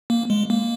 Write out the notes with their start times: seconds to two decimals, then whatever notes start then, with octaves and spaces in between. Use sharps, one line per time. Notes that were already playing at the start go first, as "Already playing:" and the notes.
0.10 A#3
0.30 G#3
0.50 A#3